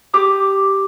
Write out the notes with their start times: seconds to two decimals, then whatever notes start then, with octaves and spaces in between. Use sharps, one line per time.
0.14 G4 D6 D#6